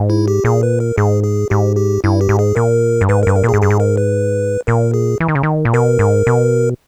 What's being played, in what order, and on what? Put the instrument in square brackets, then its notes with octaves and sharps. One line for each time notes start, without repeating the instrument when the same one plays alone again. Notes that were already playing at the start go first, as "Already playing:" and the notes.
Already playing: [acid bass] G#2
[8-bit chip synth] E4
G4
[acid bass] A#2 [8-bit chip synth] G#4
[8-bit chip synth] B4
A#4
[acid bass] G#2 [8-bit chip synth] G#4
[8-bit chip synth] G#4
[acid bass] G#2 [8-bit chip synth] G4
[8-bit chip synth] G4
[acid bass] G2 [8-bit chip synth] E4
[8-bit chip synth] G4
[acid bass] G#2
[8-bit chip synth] G#4
[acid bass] A#2 [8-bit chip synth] A#4
[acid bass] G2
[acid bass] G#2 [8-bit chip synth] B4
[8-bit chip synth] A#4
[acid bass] G2 [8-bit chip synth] B4
[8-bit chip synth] A#4
[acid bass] A#2
[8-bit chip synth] G#4
[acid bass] G#2
[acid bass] G2 [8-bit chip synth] G#4
[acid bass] G#2
[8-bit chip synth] A#4
B4
[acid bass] A#2 [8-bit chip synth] A#4
[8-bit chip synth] G#4
[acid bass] E3
D#3
C#3
D#3
A#2
[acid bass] B2 [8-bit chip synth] A#4
[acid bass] G#2
B2